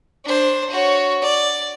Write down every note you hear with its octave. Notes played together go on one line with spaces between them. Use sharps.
D4 C5
F#4 C#5
D5